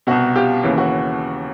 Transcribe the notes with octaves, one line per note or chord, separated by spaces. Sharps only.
C2 B2 F#4
F4 G4
D#2 C#3 E3
F#4